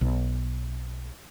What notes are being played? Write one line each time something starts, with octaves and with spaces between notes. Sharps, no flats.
B1